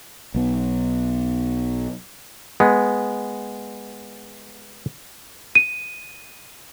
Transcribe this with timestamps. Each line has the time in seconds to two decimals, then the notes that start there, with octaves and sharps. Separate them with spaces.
0.35 B1 B3
2.60 G#3 B3
5.55 D#7